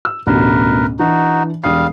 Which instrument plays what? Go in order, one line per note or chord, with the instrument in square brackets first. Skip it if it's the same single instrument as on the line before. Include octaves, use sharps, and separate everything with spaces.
[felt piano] E6
[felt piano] A1 D2 B2 [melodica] A#4 B4
[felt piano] E3 D4 [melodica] D#4 F#4
[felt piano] E1 D#6 C7 [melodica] G3 F5